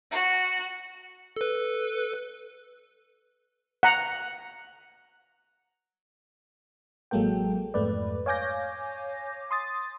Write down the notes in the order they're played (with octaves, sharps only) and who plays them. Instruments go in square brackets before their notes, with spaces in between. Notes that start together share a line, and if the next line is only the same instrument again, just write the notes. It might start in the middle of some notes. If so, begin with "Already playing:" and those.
[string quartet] F#4
[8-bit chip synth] A4 B4
[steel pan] F#5 A#5
[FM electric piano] A1 F#3 G#3 A#3 A4 G5
F2 G#2 A3 B4 D5
C#5 F5 G#5 D6 G6 A#6
C6 D#6 A6